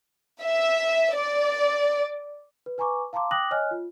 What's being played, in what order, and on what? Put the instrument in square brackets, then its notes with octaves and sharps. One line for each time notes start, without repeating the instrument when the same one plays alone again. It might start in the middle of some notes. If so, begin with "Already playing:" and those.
[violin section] E5
D5
[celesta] B4
B4 G#5 A#5 C#6 D6
F5 A5 A#5 C6 D6
G5 D6 D#6 F#6 A#6 F#7
C#5 D#5 G#5 F6 F#6
F4